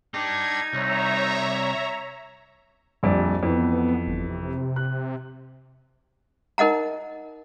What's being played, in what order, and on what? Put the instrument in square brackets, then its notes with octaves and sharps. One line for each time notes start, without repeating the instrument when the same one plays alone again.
[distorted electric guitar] D4 G4 [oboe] D#4 [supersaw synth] G#6
[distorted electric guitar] C2 [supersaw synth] C#5 E5 A#5
[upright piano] A#1 F2 D5 [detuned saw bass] G3
[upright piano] F2 E3 [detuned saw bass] B3
[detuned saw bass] G1
C3
[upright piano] F#6
[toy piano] D#4 A#4 D#5 F#5 A#5